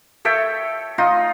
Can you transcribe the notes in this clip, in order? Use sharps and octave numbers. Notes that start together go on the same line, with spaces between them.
A4 C#5 E5 G5
D#4 F4 D#5